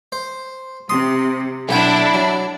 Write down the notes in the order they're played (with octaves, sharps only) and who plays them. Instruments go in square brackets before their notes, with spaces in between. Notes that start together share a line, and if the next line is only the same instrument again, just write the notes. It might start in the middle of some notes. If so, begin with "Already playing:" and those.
[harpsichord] C5
[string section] C3 [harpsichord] C6 D#6
[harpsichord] B1 F#5 G5 [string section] D4 E4
[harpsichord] F#3